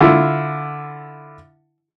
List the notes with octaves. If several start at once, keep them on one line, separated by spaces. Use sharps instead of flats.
D3 E4 F4